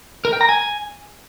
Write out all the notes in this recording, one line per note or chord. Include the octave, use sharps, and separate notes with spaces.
A#4
G5
A#5
G#5